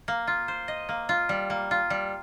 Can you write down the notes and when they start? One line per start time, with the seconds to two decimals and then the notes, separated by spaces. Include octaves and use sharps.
0.08 A#3
0.27 F4
0.48 C5
0.68 D#5
0.89 A#3
1.09 F4
1.29 G3
1.50 A#3
1.71 F4
1.90 G3